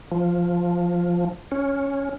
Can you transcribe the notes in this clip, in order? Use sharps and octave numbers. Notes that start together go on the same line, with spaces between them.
F3
C#4